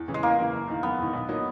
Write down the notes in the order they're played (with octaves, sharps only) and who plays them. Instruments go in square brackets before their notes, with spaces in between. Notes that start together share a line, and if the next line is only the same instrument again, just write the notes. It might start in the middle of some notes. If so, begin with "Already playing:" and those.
Already playing: [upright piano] E2
C#3 E3
[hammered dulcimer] G#3
[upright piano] E2 [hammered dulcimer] A#3
[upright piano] C#3 E3
F#1
E2 D#3
[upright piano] F#1 [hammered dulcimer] B3
[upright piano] E2 D#3
B1
B2 F#3 A#3 D#4